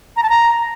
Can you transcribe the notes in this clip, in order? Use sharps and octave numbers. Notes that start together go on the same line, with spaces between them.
A#5
A5
A#5